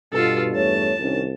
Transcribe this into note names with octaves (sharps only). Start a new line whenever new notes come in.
G2 B2 F4 A4
E2 A3 C#5 A5
C2 D#3 C#4